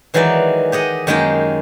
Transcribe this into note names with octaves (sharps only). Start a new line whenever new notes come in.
D#3 E3 F#3 G#3 D#4 D5
G4 G#4 D#5 F#5
F#2 D#3 G#3 A#3 G#4 G5